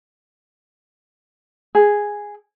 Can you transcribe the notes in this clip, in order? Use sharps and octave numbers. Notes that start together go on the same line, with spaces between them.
G#4